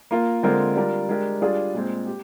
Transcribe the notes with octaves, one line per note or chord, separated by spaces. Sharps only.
A#3 F4 A#4
D3 G#3 C4 F4 A#4
G3 D4 F4 A#4
G#3 D4 G4 A#4
G3 D4 F4 G#4 D5
A#2 G#3 C4
G4